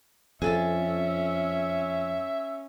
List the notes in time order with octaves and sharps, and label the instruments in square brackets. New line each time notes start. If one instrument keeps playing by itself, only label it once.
[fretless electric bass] F2 [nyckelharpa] C#4 [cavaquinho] G#4 A4 A5 [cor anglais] E5